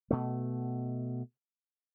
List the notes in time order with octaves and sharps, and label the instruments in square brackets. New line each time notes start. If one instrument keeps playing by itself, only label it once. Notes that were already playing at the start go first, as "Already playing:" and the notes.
[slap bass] B2 A3